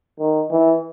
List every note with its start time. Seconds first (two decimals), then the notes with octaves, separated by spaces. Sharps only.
0.20 D#3
0.50 E3